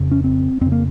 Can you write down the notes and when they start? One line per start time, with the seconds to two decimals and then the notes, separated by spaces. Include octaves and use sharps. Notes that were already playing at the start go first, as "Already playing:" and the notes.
Already playing: F2 C#3
0.11 C#4
0.24 C4
0.61 F2 C#3 C4
0.72 A#3